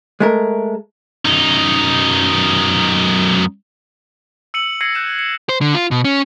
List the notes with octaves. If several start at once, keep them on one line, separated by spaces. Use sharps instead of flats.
G#3 A3 A#4
F#2 D#4
E6 C#7 D#7 F#7
G#6 A#6 C7 C#7 D#7 F#7
F#6 G6 C#7 D#7 E7
C#7
C5
D3
F4
B2
C#4